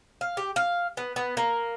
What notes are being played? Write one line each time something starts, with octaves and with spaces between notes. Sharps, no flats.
F5
G4
F5
B3
B3
A#3